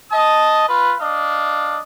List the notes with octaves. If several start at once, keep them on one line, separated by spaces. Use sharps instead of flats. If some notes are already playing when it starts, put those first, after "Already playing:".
D#5 A5 D#6
F4 B4
D4 D#5 F5